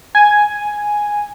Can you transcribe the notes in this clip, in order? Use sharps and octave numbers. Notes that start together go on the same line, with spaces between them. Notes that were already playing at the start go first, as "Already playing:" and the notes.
G#5